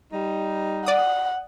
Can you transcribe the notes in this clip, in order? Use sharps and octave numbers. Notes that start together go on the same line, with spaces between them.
G3 D#4
D5 F#5 D#6